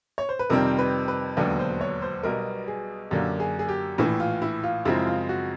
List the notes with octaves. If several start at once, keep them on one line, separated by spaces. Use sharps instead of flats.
C#5
C5
B4
F2 C3 D#3 G3 C4 A#4
B4
B4
E1 D#2 D3 F#3 B3
C5
C#5
C5
B1 B2 G3 B3 A#4
G#4
F#2 D3 F#3 A#3 G4
G#4
G#4
G4
A#1 A2 E3 E4
F4
E4
F4
F#2 C#3 F3 G#3 C4 E4
F4
F#4